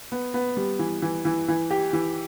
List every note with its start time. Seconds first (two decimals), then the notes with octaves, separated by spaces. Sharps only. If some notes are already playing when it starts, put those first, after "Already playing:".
0.12 B3
0.34 B3
0.57 G3
0.79 E3
1.02 E3
1.25 E3
1.48 E3
1.71 G4
1.93 E3